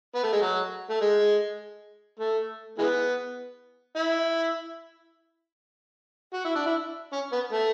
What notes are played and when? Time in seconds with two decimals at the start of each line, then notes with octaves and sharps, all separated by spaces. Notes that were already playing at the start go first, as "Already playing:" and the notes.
0.15 B3
0.23 A3
0.33 G#3
0.42 F#3
0.90 A3
1.01 G#3
2.19 A3
2.78 E3 G#3 B3
3.97 E4
6.33 F#4
6.45 E4
6.55 D4
6.66 E4
7.13 C#4
7.32 B3
7.52 A3